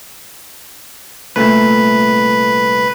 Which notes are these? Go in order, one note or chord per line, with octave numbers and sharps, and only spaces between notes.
C2 A#2 A3 B4